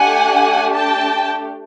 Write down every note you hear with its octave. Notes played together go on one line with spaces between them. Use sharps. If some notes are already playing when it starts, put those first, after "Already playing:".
Already playing: A3 D4 G4 F#5 G#5
G5 A5